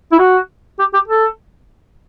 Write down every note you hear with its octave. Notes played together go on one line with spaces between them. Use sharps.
E4
F#4
G4
G4
A4